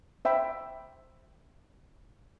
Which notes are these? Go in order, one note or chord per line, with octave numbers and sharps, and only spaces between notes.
C5 E5 G5 B5